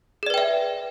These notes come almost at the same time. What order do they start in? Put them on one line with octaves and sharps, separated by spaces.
G#4 D5 B4 G5 E5